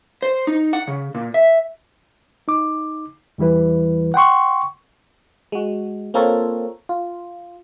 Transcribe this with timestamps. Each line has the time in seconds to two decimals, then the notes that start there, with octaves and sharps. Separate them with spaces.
0.22 C5
0.47 D#4
0.73 F#5
0.88 C#3
1.15 A#2
1.34 E5
2.48 D#4 D6
3.38 E2 E3 G3 E4 B4
4.14 F#5 G5 C6 C#6
5.52 G#3 F#4
6.14 A#3 C4 F4 A4 A#4 C#5
6.89 F4